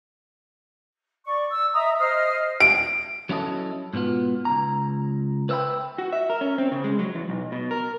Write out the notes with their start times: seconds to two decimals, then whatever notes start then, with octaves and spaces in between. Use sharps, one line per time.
1.26 D5 C#6
1.51 E6
1.74 D#5 E5 A#5 D#6
1.98 C5 D#5 D#6 F6
2.60 D7
3.29 F#3 C#4 E4 A4 D#5
3.93 G#2 B2 B3 F4
4.45 C#2 A#5
5.49 B4 C5 E5 F#5 G5 B5
5.98 F#4
6.12 E5
6.30 A#4
6.41 C#4
6.58 C4
6.72 C#3
6.84 G#3
6.99 F#3
7.15 E2
7.29 B1
7.52 B2
7.71 A#4